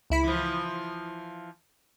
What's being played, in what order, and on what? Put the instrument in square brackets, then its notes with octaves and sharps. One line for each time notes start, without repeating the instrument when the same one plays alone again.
[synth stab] C#2 E4 B5
[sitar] E3 F3